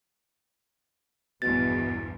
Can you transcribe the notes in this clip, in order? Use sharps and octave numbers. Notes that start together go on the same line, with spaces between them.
A#1 E2 G2 B2 A6